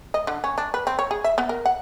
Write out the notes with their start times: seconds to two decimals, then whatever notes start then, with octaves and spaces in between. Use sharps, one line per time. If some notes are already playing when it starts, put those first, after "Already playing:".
0.14 D#5
0.27 D3
0.44 C#4
0.58 D4
0.74 B4
0.87 C4
0.99 C#5
1.11 G#4
1.24 E5
1.38 B3
1.49 A#4
1.66 F#5